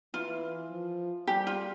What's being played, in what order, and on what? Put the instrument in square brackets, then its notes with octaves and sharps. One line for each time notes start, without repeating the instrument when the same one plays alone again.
[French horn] E3 [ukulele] F4
[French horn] F3
[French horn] G3 [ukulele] G4
[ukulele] F4